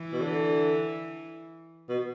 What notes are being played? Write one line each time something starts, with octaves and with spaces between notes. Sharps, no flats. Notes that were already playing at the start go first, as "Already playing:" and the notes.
Already playing: E3
B2
D3
B2